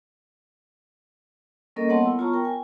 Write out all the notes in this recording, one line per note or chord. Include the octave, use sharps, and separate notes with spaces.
G3 A#3 C#4 A4 A#4 D#5
G3 B3 C#5 F#5 A5 C6
E4
B3 F4 C#5 A5 A#5 C#6
A#4 G5
G#5